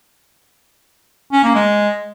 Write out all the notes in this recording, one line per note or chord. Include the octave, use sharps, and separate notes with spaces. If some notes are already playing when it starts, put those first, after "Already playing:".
C#4
A#3
G#3